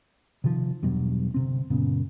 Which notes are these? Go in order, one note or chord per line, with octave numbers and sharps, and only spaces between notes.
C3 D#3 F3
E2 G2 B2 F#3
G1 C3 C4
F#2 A#2 C#3 B3